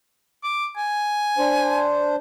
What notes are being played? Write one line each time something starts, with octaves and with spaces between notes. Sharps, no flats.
D6
G#5
D4 C5